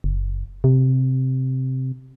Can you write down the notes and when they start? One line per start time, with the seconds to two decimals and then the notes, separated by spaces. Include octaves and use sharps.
0.04 F#1
0.64 C3